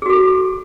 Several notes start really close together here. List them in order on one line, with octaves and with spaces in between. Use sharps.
G#4 F#4 A4